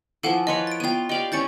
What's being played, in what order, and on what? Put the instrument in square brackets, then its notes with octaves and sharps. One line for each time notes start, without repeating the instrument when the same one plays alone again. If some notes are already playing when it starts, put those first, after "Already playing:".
[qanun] E3 F3 [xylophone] A4 F5 F#5
[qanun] F4 B4 C#5 [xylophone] D#5 C6 C#7
[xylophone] A6 D7
[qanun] B3 F4 [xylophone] G5 D#7
[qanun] G4 D5 F5 [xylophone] D#5 G5
[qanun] C#4 E4 [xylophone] G6 A6 C#7